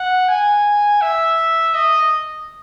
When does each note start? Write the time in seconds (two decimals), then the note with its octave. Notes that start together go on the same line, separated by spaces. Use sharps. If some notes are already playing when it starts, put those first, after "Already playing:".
Already playing: F#5
0.28 G#5
1.01 E5
1.74 D#5